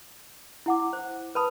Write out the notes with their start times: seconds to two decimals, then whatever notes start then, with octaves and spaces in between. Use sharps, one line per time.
0.66 E4 F#5 D6
0.93 C5
1.35 B4 A5 B5 D#6